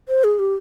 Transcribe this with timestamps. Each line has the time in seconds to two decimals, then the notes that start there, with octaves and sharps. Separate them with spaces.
0.08 C5
0.24 G#4
0.39 G4